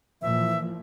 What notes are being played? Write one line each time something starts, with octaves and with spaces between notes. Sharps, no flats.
A#2 E3 F3 E5